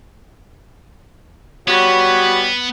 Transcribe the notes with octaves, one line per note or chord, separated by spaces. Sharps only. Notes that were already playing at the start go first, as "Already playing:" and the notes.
G3 B3 F#4 C#5